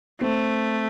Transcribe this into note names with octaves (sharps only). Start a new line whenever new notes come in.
A3 C4